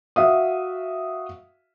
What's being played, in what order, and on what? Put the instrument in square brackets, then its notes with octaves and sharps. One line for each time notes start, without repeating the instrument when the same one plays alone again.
[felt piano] F#4 E5 F5 D#6